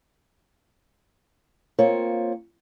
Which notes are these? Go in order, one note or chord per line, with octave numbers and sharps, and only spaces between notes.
A#3 C4 F4 C#5